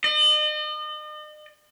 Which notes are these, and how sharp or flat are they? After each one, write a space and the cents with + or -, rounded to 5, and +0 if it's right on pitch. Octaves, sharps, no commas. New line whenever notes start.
D#5 -40